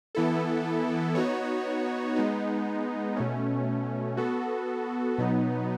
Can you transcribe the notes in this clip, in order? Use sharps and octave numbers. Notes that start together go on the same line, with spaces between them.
E3 B3 E4 A4
B3 D#4 F#4 C#5
G#3 B3 D#4
B2 A3 C#4
B3 F#4 A4
B2 F#3 B3 D#4